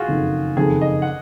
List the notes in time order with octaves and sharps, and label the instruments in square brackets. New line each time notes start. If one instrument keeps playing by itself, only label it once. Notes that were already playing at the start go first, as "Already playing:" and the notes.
Already playing: [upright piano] F4 F#4 G#4
[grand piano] F#1 F2 D#3
[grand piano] F#1 F2 D#3 [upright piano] G#4
[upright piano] D#5
F#5